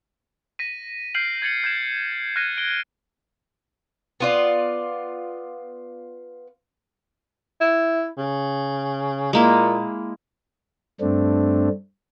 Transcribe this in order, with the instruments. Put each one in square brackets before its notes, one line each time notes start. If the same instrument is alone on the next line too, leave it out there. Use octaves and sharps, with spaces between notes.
[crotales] A#6 B6 D#7
F6 G6 C7 D7 F#7
G#6 A6 C#7 F#7
G6 G#6 E7
F6 F#6 G#6 A#6 D#7
D7 G7
[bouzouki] B3 F4 D5
[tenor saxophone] E4
C#3
[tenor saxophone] A#2 [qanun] G#3 A#3 E4
[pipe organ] G2 A3 C4 D4